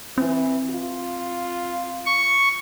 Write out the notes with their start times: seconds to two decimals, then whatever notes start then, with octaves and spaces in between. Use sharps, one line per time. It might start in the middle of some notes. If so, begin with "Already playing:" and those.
0.18 E3 C4
0.70 F4
2.06 C#6